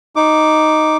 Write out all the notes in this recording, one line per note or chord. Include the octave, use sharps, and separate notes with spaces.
D#4 D6